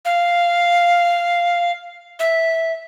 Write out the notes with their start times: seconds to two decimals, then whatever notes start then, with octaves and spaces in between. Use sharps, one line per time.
0.05 F5
2.20 E5